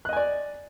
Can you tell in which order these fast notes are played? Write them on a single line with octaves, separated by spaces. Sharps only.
F#6 D#5 G#5 D5